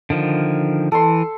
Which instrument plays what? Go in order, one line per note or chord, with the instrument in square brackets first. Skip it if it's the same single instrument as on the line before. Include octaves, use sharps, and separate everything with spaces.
[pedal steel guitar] D3 D#3 F3
[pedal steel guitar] E3 [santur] A4 C6